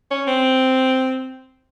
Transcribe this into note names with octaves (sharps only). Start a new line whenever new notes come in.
C#4
C4